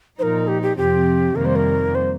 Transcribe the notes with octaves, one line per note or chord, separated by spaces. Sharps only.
A#2 F3 D#4 A#4 C5
G4
G4
F2 C3 F3 C4 G4
F2 C3 D#3 G3 A#3 A#4
C5
A#4
C5